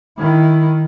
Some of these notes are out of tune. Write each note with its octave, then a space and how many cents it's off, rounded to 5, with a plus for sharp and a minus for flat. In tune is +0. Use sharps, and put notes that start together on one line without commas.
D#3 +0 E4 +0